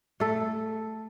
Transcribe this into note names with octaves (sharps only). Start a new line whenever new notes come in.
A3 A4